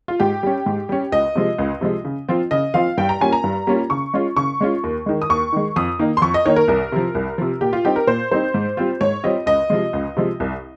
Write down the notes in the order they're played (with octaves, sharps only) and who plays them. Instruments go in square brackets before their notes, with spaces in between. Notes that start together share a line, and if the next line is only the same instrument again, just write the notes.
[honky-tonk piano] F4
G#2 G4
G3 C#4
G#2
G3 C#4
C#2 D#5
C3 F3 G#3
C#2
C3 F3 G#3
C#3
F3 C4 F4
C#3 D#5
F3 C4 F4 F5
G2 G5
A#5
G3 A#3 C#4 F4 G#5
A#5
G2
G3 A#3 C#4 F4
C#3 C#6
G#3 C#4 F4
C#3 C#6
G#3 C#4 F4
D#2
D#3 G#3
D#6
D#2 C#6
D#3 G#3
F2 D#6
D#3 A#3 D#4
C6
F2 C#6
D#5
D#3 A#3 D#4 C#5
A#4
C2 A#4
C3 F3
C2
C3 F3
A#2 G4
F4
G3 C4 D#4 G4
A#4
A#2 C5
G3 C4 D#4 C5
G#2
G3 C4 F4
G#2 C#5
G3 C4 F4 D#5
C#2 D#5
C3 F3 G#3
C#2
C3 F3 G#3
C2